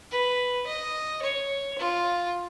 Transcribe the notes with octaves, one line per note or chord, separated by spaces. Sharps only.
B4
D#5
C#5
F4